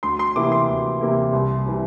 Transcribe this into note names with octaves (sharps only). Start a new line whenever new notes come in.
D2 C6
C6
C3 E3 A#3 E4 D6
C6
D2
C3 E3 A#3 E4
C2
C3 E3